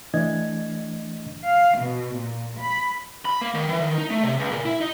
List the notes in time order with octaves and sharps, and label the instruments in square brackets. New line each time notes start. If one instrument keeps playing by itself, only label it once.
[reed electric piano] E3 A3 D4 D#5 G#6
[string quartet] F5
B2
A#2
B5
[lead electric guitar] B5
A#3
D#3
E3
D#3
D#4
A3
C3
C#2
A#2
E4
D#4